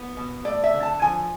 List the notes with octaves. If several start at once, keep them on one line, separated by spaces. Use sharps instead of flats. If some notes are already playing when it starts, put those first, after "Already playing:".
Already playing: B3
B2
A3 D5
E5
D3
A5
F3 G#5